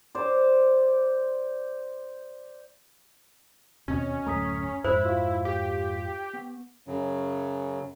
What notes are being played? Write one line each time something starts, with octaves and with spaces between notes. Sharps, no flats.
C5 D5
D#2 B2 C4 C#4 F#4 D#5
D1 F#2 A3 A#5 D#6 B6
F2 G#2 E4 C5 B5 E6
F4 F#4 F5
G4
B3
F#2 C#3 F#3